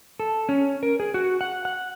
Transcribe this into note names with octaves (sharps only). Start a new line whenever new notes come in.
A4
C#4
A#4
G#4
F#4
F#5
F#5